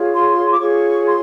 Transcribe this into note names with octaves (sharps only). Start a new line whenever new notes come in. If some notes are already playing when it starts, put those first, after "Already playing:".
Already playing: F4 G#4 C#5
C6
D6
F4 G#4 C#5 C#6
C6